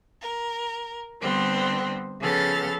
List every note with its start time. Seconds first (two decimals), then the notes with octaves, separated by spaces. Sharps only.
0.21 A#4
1.21 D3 G3 B3 C4 C5
2.20 C#3 F3 B3 A4 F6 A6